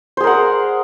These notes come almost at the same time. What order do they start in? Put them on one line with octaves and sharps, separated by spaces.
C5 G#4 A#4 F#5